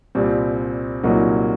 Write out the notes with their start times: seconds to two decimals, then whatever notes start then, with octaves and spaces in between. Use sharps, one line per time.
0.15 C2 A#2 G3 C4
1.04 C2 A#2 F#3 A#3 D#4